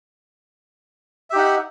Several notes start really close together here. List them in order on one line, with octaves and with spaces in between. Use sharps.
E5 G4 D#4 F#5